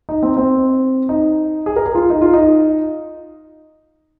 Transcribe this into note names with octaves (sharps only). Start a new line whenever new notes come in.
D#4
C4
C4
D#4
G#4
A#4
G#4
F4
D#4
F4
D#4